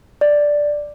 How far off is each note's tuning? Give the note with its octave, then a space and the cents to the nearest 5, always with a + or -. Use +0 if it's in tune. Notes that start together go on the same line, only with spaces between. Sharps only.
D5 +0